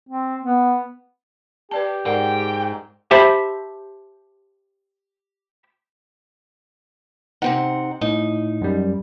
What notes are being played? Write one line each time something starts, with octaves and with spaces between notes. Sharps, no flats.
C4
B3
G4 B4 D5 A5
G#2 A#4 D5 F#5 G5
G4 C5 E5 A5 B5
C3 C4 D#4 F#5
A2 D#4
F#2 G3